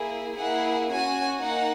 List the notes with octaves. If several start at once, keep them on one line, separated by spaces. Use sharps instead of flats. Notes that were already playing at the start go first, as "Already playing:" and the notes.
Already playing: A#3 E4 G#4
A#3 E4 G#4 F#5
C#4 F#4 G#5
A#3 D#4 F#5